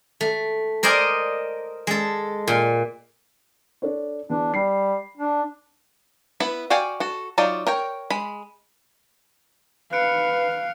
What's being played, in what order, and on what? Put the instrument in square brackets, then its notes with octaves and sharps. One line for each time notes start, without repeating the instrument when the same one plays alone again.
[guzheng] A3
A#4 C5 D5 D#5 G#5
G#3 A4
A#2
[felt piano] D4 A4 C#5
[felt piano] E2 [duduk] D4
[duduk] G3 [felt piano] C7
[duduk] D4
[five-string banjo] B3 E4 B4
F#4 D5 F5 G5 G#5
F#4 A4
F#3 D#4 F4 D5
A#4 C#5 G5
G#3 B5
[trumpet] B4 [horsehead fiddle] F5 [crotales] F#6 C#7 D7